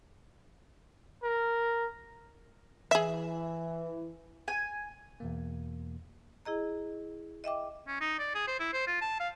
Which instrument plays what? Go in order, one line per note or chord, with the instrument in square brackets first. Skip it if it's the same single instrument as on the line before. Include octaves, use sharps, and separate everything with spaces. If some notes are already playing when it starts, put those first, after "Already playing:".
[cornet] A#4
[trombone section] E3 [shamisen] G#4 E5
[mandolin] G#5
[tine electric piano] E2 B2 A#3
[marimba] E4 G#4 D#5 A#5
D#5 E5 G5 D6
[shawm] C#4
D#4
D5
G#4
C5
E4
C5
F4
A5
F5